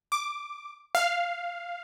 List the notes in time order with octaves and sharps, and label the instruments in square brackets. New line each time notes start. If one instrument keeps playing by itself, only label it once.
[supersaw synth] D6
F5